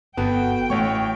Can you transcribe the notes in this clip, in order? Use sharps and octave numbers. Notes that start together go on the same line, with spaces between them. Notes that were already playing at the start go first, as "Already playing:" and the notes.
G1 B3 F#4 A4 G5
A1 A3 C#5 C#6